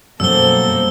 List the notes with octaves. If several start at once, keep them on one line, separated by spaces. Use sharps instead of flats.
F#2 B2 G3 A#3 A4 C5 E6 G7